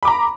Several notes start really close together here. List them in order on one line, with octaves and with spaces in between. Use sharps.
B5 D6 A#5